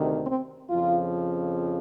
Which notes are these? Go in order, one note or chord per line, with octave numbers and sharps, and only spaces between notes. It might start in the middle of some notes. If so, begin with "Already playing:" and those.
Already playing: D2 C3 D#3
C4
F2 C#3 F3 F4